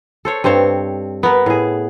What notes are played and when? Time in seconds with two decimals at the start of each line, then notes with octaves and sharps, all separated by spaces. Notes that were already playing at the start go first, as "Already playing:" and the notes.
0.25 A4 C5 C#5
0.44 G2 C4 C5 C#5
1.23 B3 A#4
1.46 A2 G#4